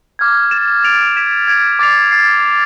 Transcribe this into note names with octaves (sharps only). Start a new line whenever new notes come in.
D6 F6 G#6
A6 E7
A6 D7 F7
G#6 B6 E7
G#6 D7 F7
D6 A6 C7 F7
F6 A6 C7